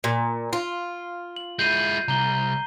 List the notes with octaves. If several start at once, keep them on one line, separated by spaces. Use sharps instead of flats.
A#2
F4
F#7
G#3 E4 G6 C7 D#7
C2 A#5 G7